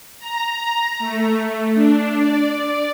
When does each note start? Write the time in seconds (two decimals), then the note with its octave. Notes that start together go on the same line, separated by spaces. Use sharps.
0.19 A#5
0.99 A3
1.75 D4
2.13 D5